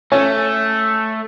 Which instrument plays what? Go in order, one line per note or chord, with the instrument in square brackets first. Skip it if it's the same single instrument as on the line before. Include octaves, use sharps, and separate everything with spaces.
[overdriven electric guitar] A3 [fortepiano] C#4